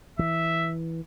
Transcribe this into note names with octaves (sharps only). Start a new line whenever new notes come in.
E3 E5